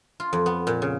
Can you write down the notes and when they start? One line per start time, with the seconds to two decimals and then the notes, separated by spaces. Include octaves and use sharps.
0.20 F4
0.33 F2
0.46 B3
0.67 A#2
0.82 C#3